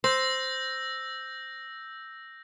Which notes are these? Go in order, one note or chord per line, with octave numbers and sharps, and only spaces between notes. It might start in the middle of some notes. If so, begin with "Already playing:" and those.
C5 E6 G6 A#6